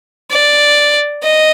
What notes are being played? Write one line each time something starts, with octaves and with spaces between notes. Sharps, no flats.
D5
D#5